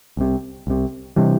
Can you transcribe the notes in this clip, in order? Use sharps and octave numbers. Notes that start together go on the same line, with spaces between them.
C2 C3
C2 C3
C3 E3 G3